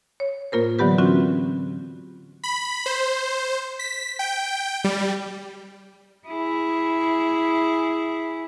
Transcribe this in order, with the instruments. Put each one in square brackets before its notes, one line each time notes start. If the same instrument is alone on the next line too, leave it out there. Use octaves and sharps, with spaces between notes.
[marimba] C#5
A2 A#3 F4 A#4 C5
D3 E3 F#3 B3 G4 B4
E3 F#3 C4 C#4 F4 F#4
[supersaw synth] B5
C5
B6
G5
G3
[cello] E4 G#4